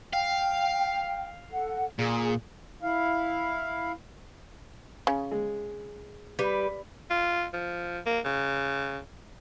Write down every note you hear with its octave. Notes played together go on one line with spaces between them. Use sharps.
F5 G5
A4 F#5
A#2 G#4
E4 F5
C#3
G#3
G3 B4
F4
F3
A#3
C#3